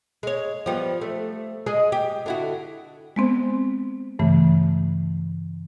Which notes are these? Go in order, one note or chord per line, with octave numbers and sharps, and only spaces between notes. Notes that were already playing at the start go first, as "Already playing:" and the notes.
G#3 C#5
F3 G3 B3
A3
G#3 G#4 D#5
G4
D3 E4 F#4
G#3 B3 C4 C5
G2 C#3 E3 A3